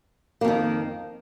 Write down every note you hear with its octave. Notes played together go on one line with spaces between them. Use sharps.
F2 D#3 A#3